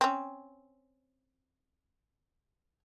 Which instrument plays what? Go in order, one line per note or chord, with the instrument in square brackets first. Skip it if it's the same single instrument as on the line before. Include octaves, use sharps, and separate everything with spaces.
[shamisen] C4 C#4